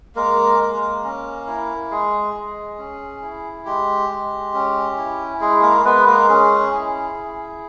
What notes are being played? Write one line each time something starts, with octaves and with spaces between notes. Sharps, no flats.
G#3 A#3 A#4
G#3
C#4
E4
G#3 G#4
G#3
C#4
E4
G#3 G4
G#3
C#4
E4
G#3 G#4
A#3 A#4
G#3 B3 B4
A#3 A#4
C#4 G#4
E4
E4